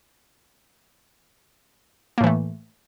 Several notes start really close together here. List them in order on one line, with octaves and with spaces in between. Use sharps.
A#3 A2 E3 A3